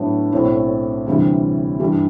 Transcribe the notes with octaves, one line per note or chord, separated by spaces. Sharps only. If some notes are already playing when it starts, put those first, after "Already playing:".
Already playing: A2 F#3 B3 D4
B1 A2 F#3 C4 E4
D2 C3 E3 G3
G2 E3 G3